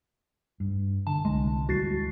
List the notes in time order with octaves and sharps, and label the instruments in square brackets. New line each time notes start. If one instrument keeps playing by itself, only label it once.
[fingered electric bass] G2
[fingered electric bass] D3 [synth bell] A5
[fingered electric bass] C2 D3 [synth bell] G#3
[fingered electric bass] D2 E3 G3 [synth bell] F#4 A6 C7